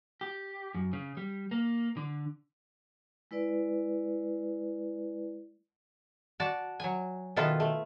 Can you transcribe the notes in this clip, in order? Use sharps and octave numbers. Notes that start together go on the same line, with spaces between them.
G4
F#2
C#3
G3
A#3
D3
G#3 E4 B4 D5
F#4 D5 A5
F#3 G#5
B2 D#3 E4 F4 A4 B4
A3